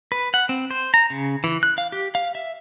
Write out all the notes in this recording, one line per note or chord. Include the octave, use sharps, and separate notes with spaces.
B4
F#5
C4
C5
A#5
C#3
E3
F#6
F5
G4
F5
E5